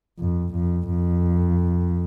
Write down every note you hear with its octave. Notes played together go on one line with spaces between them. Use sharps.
F2
F2
F2